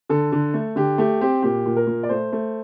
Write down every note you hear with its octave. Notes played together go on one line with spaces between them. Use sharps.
D3 A4
D3
A3
D3 G4
A3 G4
C4 G4
A#2 G4
A#2
A#4
A#2
D5
A3 C5
A3